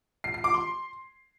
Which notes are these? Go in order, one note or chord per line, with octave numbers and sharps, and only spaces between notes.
C7
C7
D6
C6